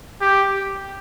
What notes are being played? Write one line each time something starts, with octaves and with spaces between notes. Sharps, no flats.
G4